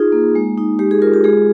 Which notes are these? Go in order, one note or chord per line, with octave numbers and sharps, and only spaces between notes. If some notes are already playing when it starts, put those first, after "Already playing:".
Already playing: D#4 F4 G#4
A#3
G#3
D#4
G#3 G4
G#4
F4 A#4
G4
G#3 G#4